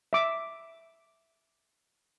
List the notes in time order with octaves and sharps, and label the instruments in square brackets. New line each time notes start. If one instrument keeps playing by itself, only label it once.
[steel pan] E5 D6